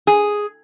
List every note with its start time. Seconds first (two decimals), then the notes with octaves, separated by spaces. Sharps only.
0.07 G#4